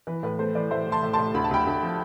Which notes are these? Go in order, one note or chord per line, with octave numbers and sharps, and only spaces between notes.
E3 B4
A2 B4
A3 C5
E3 B4 D5
A2 C5 E5
A2
A5 C6
A2
A5 C6
A2
D2 B5
A5
D2 G5 B5
D2
F3